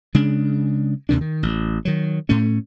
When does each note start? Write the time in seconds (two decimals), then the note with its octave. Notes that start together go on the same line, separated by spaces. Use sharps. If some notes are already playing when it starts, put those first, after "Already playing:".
0.15 C#3 G#3 D4
1.09 D#2 C3 D#3 D4
1.21 D#3
1.43 A1
1.85 D#3 F#3
2.29 A2 A3 C#4